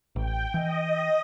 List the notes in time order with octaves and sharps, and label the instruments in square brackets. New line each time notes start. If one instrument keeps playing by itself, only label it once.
[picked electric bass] A1 [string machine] G5
[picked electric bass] E3 [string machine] D#5